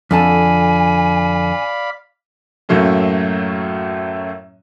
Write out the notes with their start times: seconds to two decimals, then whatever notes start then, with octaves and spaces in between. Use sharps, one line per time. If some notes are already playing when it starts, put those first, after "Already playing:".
0.11 F2 D3 D5 F5 G#5 A5 B5
2.69 F#2 A2 F#3 A3 A#3 C#4